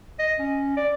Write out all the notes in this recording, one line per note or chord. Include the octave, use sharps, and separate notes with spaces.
D#5
C#4
D5